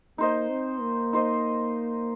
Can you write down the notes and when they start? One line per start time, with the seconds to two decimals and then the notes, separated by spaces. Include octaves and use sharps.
0.18 A#3 D#4 C5 D#5
0.50 C4
0.81 A#3
1.13 D#4 C5 D#5